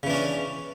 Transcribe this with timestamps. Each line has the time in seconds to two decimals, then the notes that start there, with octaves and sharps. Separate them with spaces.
0.03 C#3
0.07 E3
0.10 D4
0.13 C#4